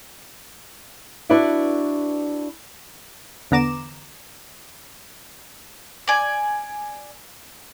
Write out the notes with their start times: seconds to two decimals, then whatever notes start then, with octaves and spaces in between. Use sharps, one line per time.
1.29 D4 E4 F#4 B4 D5 E5
3.51 E2 D3 B3 A#5 D6 E7
6.08 D5 G#5